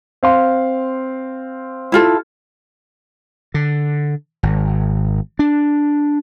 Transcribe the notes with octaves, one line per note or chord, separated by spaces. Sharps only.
C4 F5 C6
E4 F4 A4
D3
G#1
D4